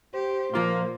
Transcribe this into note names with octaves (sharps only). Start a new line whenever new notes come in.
G4 C5
A#2 F3 A#3 F4 C6